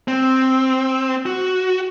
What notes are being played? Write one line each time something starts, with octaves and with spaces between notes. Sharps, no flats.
C4
F#4